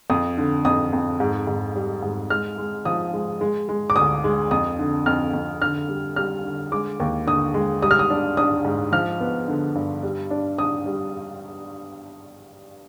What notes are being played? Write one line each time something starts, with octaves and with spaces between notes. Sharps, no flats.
F2 D#6
D3
F2 D#6
F2
G#2
G#2
G3
G#2
G#3 F6
G#3
F3 D#6
G#3
G#3
G#3
D6
D2 D#6
G#3
F2 D#6
D3
F2 F6
F2
D3 F6
G3
G3 F6
D3
G#3 D6
D#2
D3 D#6
G#3
G3 D#6
F6
D#6
D4
D4 D#6
G#2
F3 F6
B3
D3
G2
G3
D4
D4 D#6
G3